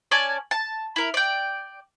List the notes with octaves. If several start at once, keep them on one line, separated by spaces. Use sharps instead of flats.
C#4 D5 G#5 A5
A5
E4 A#4
D5 G5